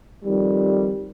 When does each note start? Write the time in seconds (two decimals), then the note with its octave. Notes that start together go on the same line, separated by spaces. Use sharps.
0.24 F2 D#3 G3